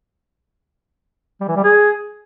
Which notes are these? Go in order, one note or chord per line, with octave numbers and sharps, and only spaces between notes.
G3
E3
G3
G#4